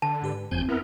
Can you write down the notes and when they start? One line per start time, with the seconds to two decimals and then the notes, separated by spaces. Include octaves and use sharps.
0.02 D3 A5
0.22 G#2 G4 B4
0.51 F#1 F2 C4 G#5 G6
0.69 B3 E4 A#4